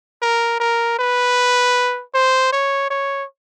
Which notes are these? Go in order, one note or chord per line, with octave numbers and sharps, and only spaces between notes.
A#4
A#4
B4
C5
C#5
C#5